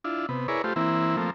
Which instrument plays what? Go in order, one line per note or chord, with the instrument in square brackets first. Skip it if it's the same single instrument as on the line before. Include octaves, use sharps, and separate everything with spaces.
[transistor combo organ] D4 E4 F4
C3 B3
E4 G#4 A#4 B4 C#5 D5
A3 F4 G4 C5
E3 A#3 C4 E4
F3 A3 A#3 C4